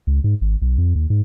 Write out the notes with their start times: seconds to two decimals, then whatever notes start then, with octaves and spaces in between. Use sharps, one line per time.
0.07 C#2
0.24 G#2
0.41 G#1
0.62 B1
0.78 F2
0.95 D#2
1.10 G#2